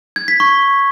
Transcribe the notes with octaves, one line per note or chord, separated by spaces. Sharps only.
G#6
B6
C#6